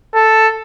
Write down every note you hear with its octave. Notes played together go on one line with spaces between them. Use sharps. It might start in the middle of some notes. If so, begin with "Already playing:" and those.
A4